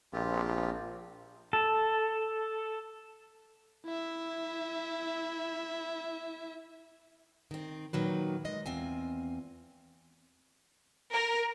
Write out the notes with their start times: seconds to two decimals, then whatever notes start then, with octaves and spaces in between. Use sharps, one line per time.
0.13 A#1 C4 F4 G4
1.53 A4
3.85 E4 E5
7.51 D#3 C4
7.93 A#2 D#3 F#3 B4
8.45 G#3 D#5
8.66 E2 C4 F4 G#5
11.12 A#4